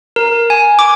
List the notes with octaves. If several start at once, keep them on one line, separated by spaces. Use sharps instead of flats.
A#4
G#5
D6